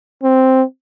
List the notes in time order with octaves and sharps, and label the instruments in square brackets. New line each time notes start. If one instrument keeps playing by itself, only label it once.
[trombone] C4